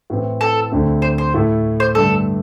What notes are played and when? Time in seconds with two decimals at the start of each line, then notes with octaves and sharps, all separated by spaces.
0.10 A2 E3 C4
0.41 A4
0.72 D2 D3 A3 C4
1.02 C5
1.18 C5
1.34 A2 A3 E4 A4
1.80 C5
1.95 G2 D3 A3 A4